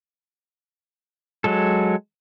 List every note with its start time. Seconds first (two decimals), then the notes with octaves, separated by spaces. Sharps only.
1.44 F#3 G#3 A4